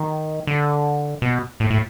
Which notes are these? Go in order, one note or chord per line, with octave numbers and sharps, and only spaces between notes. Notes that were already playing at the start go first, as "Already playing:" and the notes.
Already playing: D#3
D3
B2
A2
A2